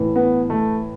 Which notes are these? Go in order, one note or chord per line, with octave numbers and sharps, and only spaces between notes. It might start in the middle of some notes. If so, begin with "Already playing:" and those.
Already playing: A2 E3
B3
A3